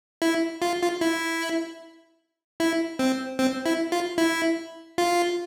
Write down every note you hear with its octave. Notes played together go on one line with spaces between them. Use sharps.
E4
F4
F4
E4
E4
C4
C4
E4
F4
E4
F4